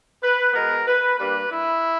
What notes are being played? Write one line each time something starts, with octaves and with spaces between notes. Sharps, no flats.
B4
B2 G#3 B3 A#4
B4
G2 G3 A#3 B4
E4